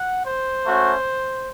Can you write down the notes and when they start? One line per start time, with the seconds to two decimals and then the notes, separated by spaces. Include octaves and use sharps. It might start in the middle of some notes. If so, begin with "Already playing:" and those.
Already playing: F#5
0.26 C5
0.66 A3 C#4 F#4